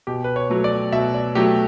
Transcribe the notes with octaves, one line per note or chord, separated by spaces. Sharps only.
B2 G4
B4
C#5
F#3 A3
D5
B2 E5
D5
F#3 A3 G4